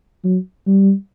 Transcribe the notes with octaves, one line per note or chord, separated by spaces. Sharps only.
F#3
G3